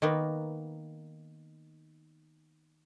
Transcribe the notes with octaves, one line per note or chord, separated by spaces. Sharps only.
D#3 A#3 B3